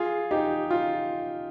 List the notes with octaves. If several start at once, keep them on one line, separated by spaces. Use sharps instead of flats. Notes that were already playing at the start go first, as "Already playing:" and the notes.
Already playing: F4 G#4
D#4 G4
F4